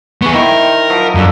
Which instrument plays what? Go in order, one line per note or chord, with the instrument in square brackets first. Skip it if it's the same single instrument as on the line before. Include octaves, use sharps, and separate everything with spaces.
[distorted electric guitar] B3 G#4 [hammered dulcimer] C#6
[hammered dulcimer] D#3 E4 C5 [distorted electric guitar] A#4
[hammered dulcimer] F3 F#3
[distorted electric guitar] F#2 [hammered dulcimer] A#3 D4 A4